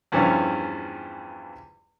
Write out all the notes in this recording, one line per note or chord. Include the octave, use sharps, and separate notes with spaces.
E2 G2 E3 F3 G3 C#4